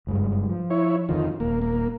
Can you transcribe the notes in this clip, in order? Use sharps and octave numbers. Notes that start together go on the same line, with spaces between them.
F#1 G2 G#3
F3
E4 C#5
F2 D3 D#3 F3
D#1 A#3
A#3